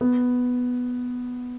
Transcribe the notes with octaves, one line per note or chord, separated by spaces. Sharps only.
B3